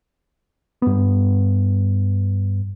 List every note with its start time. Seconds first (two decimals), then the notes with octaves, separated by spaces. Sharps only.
0.82 G2 B3